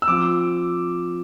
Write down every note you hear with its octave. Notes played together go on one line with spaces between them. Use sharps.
E6
F3 C4 F4 D6